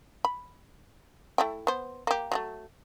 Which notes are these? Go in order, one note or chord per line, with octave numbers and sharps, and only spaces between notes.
B5
A3 E4 G5
B3 C5
A#3 G4
F#3 G#3 A3